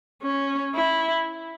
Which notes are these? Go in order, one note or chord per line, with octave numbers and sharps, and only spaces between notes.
C#4
E4